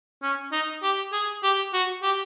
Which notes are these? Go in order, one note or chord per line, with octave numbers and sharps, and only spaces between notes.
C#4
D#4
G4
G#4
G4
F#4
G4